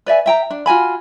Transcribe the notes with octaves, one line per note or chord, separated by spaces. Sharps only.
B4 D5 E5 G#5
E5 G5 A#5
D4
F4 F#4 G#5 B5